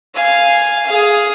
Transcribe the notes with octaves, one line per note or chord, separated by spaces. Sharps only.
F5 G#5
G#4 F5